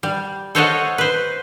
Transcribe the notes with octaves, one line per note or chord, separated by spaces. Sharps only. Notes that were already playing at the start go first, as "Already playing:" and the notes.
G3
A4 C5 C#5 D#5 F5 F#5
B4 C5